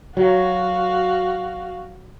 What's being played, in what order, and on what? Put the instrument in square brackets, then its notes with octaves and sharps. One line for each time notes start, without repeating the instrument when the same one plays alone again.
[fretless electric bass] F#3 [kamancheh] F#4 F5